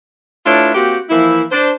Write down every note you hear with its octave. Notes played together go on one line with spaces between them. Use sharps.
A3 D4 E4 F4 B4 C#5
A#3 C4 F#4 G4
E3 F3 A#3 E4
D4 C5